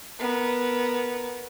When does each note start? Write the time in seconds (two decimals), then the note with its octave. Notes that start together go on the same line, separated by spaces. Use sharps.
0.19 B3 A#4